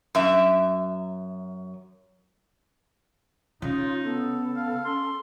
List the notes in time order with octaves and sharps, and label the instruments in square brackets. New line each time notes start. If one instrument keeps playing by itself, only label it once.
[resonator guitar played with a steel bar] F#2 E5
[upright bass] C#3 [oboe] D#4 [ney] F4
[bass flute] B3 [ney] A4
[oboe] F5
[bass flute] C#4 [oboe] C6